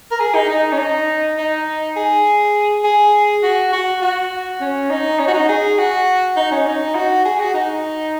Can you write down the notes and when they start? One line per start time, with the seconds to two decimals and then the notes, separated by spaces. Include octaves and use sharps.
0.11 A#4
0.20 G#4
0.35 D#4
0.49 D#4
0.72 C#4
0.78 D#4
1.38 D#4
1.96 G#4
2.84 G#4
3.43 F#4
3.73 F#4
4.02 F#4
4.61 C#4
4.90 D#4
5.19 C#4
5.28 F#4
5.34 D#4
5.49 G#4
5.78 F#4
6.36 D#4
6.51 C#4
6.66 D#4
6.95 F#4
7.25 G#4
7.39 F#4
7.54 D#4